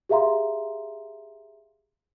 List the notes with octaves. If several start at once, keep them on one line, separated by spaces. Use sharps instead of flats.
G4 G#4 E5 F5 A#5 C6